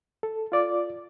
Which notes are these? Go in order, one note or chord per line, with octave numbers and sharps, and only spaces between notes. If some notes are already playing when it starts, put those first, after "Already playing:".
A4
F4 D5 D6